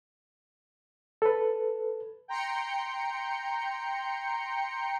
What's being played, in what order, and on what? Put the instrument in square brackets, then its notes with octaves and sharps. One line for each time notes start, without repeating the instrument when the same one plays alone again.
[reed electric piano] A4 B4
[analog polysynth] G5 A#5 C6 G6 C#7